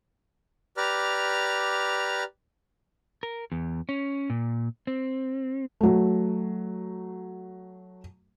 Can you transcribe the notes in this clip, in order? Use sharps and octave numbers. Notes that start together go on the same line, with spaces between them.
G4 B4 D5 A#5 F6
A#4
E2
C#4
A#2
C4
F#3 A3